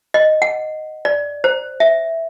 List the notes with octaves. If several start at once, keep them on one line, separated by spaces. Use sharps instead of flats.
D#5
F#5
D5
C5
E5